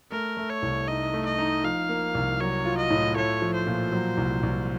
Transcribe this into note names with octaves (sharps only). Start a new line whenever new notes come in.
A3 A#4
A3
C#5
C2
D#4 D#5
A3
D#5
D#4
F3 F5
A#3
C2
F#3 C#5
F4
D#5
A2
A3 C#5
F3
C5
A#2
F#3
C2
C2